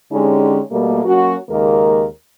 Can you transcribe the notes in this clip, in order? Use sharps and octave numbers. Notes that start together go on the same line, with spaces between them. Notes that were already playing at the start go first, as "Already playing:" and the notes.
D3 G#3 C#4 D#4 G4 G#4
B2 G3 A3 A#3
F#3 A#3 C#4 F#4
D#2 C#3 G#3 A#3 A#4